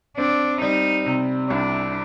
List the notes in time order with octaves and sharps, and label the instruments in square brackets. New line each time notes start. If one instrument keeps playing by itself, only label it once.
[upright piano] C4 [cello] D4
[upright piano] G3 [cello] D#4
[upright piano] C3
[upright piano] C2 [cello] D4